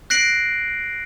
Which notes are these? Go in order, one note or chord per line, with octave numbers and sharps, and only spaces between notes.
F#6 A#6 C7 D7 F#7